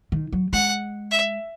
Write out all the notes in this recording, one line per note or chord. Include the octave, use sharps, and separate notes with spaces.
D#3
F#3
G#3 F#5
E5